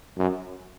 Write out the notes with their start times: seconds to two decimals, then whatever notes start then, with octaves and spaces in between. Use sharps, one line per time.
0.17 F#2